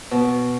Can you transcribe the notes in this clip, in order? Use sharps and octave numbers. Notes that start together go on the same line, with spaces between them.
B2